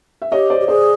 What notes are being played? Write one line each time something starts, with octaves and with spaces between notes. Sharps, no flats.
E5
G4 C#5 D#5
C5 D5
G4
G#4 C5 D5